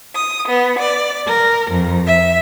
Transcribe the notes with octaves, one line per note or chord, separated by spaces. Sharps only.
D#6
B3
D5
A#4
F2
E5